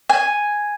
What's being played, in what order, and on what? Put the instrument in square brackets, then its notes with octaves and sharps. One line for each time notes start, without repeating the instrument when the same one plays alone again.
[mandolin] G#5